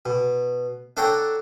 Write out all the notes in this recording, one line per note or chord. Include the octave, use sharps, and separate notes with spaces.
B2
D4 A4 C#5 F#5 G5 A#5